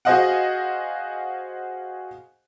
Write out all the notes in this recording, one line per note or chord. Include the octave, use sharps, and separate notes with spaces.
F#4 G#4 C5 D#5 F5 F#5